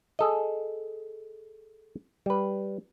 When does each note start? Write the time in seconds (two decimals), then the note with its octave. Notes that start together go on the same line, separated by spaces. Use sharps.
0.19 G#4 A4 D#5
2.26 G3 B4